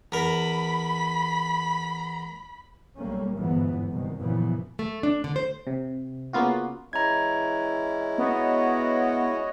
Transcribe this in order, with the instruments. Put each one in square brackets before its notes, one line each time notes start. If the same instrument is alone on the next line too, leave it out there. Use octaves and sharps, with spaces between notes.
[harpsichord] E2 A#4 [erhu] B5
[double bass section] B1 G3 A3 A#3 C#4
G1 E2 G#2 E3 B3
C2 B2 D#3
F#2 A#2 C#3 E3 F3 B3
[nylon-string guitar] A3
D4
D3
C5
[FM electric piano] C3
C#3 A#3 B3 F4 F#4
[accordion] E3 [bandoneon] G#3 C#4 E4 [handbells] A#5 G#6
[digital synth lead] B3 [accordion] F#4 C#5 D#5